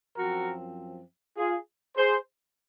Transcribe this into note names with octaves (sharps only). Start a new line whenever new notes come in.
F#2 F3 C4 F#4 A#4
F4 G#4
G#4 C5